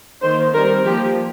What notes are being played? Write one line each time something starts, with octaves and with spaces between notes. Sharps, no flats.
D#3 A#3 C5
D#3 G3 C4 A#4
F3 A#3 G4